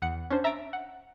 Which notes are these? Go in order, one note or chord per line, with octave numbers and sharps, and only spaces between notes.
E2 F#5 C#7
C#4 D4 C5
E5 A#5 E6 A6 B6 D7
F#5